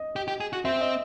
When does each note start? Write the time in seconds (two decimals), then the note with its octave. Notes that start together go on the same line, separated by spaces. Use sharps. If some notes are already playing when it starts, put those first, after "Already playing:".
Already playing: D#5
0.16 G4
0.28 G4
0.40 G#4
0.53 F#4
0.65 C4 E5
0.81 D#5